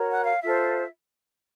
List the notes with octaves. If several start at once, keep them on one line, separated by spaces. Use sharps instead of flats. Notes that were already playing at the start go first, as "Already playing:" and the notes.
Already playing: F#4 A#4 C#5
F#5
F5
F4 A4 C5 E5